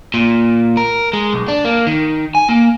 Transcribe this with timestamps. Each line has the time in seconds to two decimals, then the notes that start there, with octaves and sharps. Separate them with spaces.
0.14 A#2
0.77 A#4
1.13 G#3
1.33 B1
1.48 D4
1.65 A#3
1.87 D#3
2.35 G#5
2.49 A#3